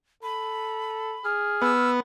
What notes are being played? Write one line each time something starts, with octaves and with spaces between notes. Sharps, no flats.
A4 B5
G#4 F6
B3 E6